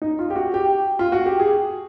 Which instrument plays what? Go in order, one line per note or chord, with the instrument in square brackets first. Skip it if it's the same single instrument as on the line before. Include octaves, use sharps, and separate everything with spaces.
[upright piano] D#4
F4
G4
F#4
G4
F4
F#4
G4
G#4